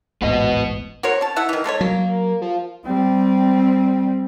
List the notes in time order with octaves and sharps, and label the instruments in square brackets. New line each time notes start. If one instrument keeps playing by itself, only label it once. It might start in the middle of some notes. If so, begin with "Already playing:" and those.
[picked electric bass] D#1 A1 G#2 [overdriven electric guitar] B3 D#5
[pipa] F#4 A#4 C5 C#5
C#4 A5
E4 E5 F#5
D#3 E3
G#3 A3 A4 C#5
[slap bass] F#3 [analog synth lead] A#3
[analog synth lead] F3
[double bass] G3 C4